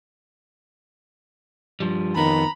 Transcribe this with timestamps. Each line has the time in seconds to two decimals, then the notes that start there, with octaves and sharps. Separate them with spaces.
1.80 G2 F3 G3
2.16 F2 D#3 B3 A#5 B5